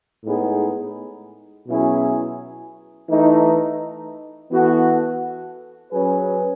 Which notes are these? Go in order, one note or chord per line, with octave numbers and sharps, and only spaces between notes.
A2 G#3 B3 D#4 G#4
B2 F#3 C#4 E4 G#4
E3 A3 D#4
E3 B3 F#4 A4
F#3 C#4 G#4 B4